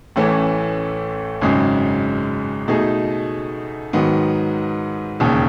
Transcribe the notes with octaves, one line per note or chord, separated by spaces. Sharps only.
A1 A2 E3 A3 C#4
G#1 F#2 C#3 G#3
B2 A3 D#4 G#4
G#2 D#3 F#3 B3
E1 D#2 C#3